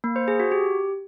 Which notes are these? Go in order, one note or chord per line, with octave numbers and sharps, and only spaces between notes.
A#3
C5
G#4
F#4
G4